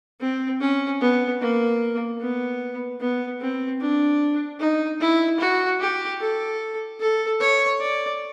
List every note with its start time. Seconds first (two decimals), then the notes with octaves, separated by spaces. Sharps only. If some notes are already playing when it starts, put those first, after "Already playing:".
0.20 C4
0.60 C#4
1.01 B3
1.41 A#3
2.20 B3
3.00 B3
3.41 C4
3.81 D4
4.60 D#4
5.00 E4
5.40 F#4
5.80 G4
6.20 A4
7.00 A4
7.40 C#5
7.80 D5